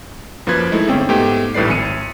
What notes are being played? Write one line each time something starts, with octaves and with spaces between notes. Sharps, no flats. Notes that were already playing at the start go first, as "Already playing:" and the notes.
F#2 F3 A#3 B4 G#6
G#3 A3 D#4 E4
G1 A3 C4 C#4 G5
G#2 A3 B3 G4 G5
A#1 A2 G3 B4 D5 C7
G#1 G#5 C#7 D#7